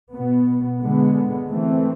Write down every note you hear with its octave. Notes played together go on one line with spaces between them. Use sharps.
B2 B3
D3 G#3 B3
E3 A3 C4